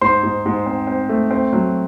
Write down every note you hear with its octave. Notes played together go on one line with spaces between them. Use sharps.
G#2 C5 C6
G#2
G#2
C4
C4
A3
C4
F#3